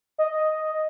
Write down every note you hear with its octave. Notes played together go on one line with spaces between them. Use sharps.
D#5